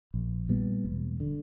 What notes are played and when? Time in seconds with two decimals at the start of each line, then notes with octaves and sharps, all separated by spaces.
0.14 A#1
0.49 A#2 G3 B3
0.85 E1
1.20 D3